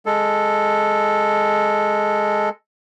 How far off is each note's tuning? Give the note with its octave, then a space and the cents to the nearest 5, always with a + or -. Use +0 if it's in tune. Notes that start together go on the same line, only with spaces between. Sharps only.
G#3 +0 A4 +0